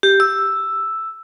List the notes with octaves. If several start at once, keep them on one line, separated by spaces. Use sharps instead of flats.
G4
E6